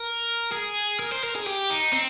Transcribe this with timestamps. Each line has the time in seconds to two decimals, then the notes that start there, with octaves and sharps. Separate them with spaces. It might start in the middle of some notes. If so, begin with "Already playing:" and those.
Already playing: A#4
0.52 G#4
0.99 A#4
1.12 C5
1.24 A#4
1.35 G#4
1.46 G4
1.70 D#4
1.93 C4